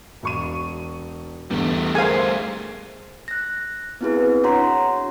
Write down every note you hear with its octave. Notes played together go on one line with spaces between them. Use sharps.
E1 C#6 D#7
E2 D3 G3 A3
G#4 A#4 C5 F5 G#5
F#6 A#6
B3 C4 E4 F#4 G#4 B4
D4 F#4 C#5 F#5 A#5 C6